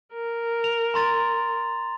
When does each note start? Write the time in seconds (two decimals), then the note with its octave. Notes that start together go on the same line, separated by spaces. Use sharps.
0.13 A#4
0.64 F7
0.94 A#5 C6 A6